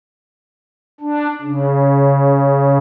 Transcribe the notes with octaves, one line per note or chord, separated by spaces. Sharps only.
D4
C#3